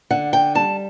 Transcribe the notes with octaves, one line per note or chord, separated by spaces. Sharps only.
D3 F#5
G5
G3 A5